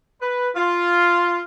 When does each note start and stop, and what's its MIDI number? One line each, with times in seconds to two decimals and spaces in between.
0.21 0.49 71
0.55 1.41 65